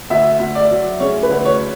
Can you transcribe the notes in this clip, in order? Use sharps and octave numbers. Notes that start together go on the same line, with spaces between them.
D2 E5
D2
D5
F#3
C#3 C#5
B4
D2
C#5